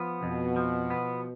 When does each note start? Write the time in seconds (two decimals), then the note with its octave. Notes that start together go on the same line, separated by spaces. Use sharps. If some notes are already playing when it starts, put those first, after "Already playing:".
Already playing: F3 B3
0.22 F2 B2
0.56 F3
0.90 B3